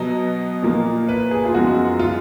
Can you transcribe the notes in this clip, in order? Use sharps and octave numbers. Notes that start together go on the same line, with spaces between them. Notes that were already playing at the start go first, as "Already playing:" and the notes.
Already playing: B2 F#3 B3 D#5
A#2 F3 A#3
B4
G#4
F4
F#2 F3 G#3 B3 F#4
F4